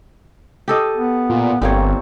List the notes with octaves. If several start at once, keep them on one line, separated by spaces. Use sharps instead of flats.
G4 A4 D#5
B3
A#2
G1 G3 A#3 C4 C#5